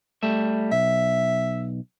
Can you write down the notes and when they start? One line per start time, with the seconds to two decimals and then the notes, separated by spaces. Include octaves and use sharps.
0.23 G3 A3 E5
0.72 B1 E5